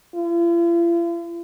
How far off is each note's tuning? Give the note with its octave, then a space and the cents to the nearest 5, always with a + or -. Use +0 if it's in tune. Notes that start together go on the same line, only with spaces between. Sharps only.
F4 -45